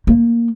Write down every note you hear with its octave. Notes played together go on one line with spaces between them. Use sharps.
A#3